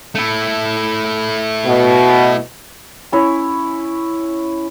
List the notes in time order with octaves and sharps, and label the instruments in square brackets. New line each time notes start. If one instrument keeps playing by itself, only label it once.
[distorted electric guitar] A3 E4
[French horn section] B2
[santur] C#4 E4 C#5